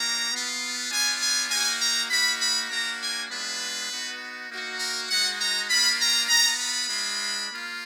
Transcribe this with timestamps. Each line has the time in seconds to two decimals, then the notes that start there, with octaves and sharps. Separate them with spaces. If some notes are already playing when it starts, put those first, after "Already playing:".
Already playing: A#3 D4 F#4 A#5
0.30 B3 F4
0.91 B3 D4 F4 G#5
1.21 G#5
1.50 A#3 D#4 F#4 G#5
1.80 A#5
2.10 A#3 D#4 F#4 B5
2.40 B5
2.69 A#3 D4 F#4 A#5
3.00 G#5
3.30 G#3 B3 D4 F4 B4
3.90 B3 D#4 F#4
4.50 A#3 D#4 F#4
4.79 A#4
5.09 G#3 D#4 F#4 F#5
5.40 A#5
5.69 A#3 D4 F4 B5
6.00 A#5
6.28 B3 F4 A#5
6.59 B5
6.89 G#3 D4 F4
7.48 A#3 F4